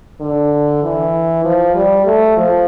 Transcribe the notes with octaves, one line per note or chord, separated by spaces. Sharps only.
D3
E3
F3
G3
A3
F3